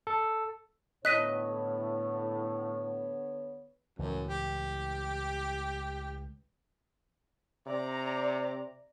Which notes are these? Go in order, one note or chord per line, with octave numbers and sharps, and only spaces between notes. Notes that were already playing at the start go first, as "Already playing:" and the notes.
A4
A2 D3 B3 C#5 D#5 F#6 B6 D#7
C#2 F#2 A2 E3
G4
C3 D5 A#5